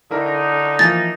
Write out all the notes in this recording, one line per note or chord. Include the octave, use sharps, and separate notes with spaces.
D3 D#4 E4 A#4
E3 F3 A#3 A6